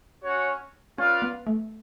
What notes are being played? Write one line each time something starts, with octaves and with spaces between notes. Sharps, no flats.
C#4 F#4 C#5
C#4 F4 B4 D5 F5
B3
A3